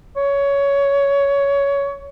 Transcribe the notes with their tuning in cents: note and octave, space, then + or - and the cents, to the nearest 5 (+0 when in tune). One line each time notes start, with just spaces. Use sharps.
C#5 +15